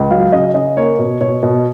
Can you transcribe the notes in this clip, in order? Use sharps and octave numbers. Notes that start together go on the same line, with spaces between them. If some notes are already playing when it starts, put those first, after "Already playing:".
Already playing: C#2
F#3 F5
C#3 D#5
C#3 D#5
A#3 C#5
B2
B2 C#5
B2